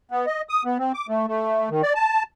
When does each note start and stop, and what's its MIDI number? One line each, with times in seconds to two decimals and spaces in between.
0.11 0.26 59
0.26 0.42 75
0.49 0.63 87
0.65 0.78 59
0.79 0.92 60
0.94 1.07 86
1.09 1.27 57
1.27 1.69 57
1.70 1.82 51
1.83 1.93 74
1.95 2.23 81